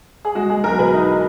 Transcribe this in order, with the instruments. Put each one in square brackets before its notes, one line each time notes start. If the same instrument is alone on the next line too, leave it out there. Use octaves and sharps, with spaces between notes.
[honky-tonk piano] G#4
[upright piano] G#3 [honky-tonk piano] F#4
[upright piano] G#3 [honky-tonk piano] G#4
[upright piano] B1 [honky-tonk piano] A#4
[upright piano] B2 [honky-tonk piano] B4
[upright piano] D#4